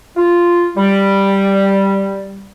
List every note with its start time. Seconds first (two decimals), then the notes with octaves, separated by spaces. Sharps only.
0.17 F4
0.77 G3